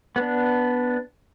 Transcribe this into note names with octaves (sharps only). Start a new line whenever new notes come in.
B3 D4